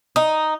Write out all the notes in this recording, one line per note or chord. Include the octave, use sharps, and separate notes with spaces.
D#4